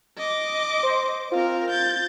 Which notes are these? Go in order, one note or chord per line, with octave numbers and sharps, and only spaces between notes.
D#5 D6
C5
C4 F4 A#4
G6 A6